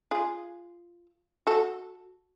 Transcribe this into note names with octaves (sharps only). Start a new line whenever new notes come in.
F4 G#4
F#4 A4